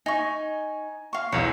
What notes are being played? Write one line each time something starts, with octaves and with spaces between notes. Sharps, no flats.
D#4 G#5 C#6
F5 C#6
B1 E2 C#5